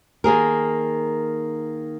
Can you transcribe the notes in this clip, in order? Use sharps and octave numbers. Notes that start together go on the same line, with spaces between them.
D#3 A#3 G#4 A#4